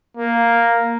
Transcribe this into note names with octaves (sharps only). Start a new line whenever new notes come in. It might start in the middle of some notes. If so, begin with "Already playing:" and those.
A#3